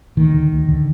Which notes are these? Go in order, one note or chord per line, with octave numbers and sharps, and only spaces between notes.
D2 D#3
D3
D2
D3